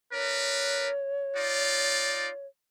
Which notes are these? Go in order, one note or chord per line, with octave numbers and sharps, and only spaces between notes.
D4 A#4 B4 C#5
D#4 F4 D5